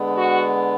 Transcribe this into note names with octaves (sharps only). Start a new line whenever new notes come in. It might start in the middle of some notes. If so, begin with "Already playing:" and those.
Already playing: D3 G#3 B3
F#4